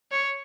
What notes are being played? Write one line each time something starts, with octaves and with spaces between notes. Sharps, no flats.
C#5